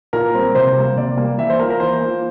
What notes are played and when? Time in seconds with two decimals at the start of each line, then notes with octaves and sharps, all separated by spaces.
0.13 A#2 A#4
0.35 G3 C4
0.55 C3 C5
0.76 G3 A#3
0.96 C3 D5
1.17 G3 A#3
1.38 E3 E5
1.50 C5
1.60 A#3 F4 A#4
1.70 A#4
1.80 E3 C5
2.01 A#3 F4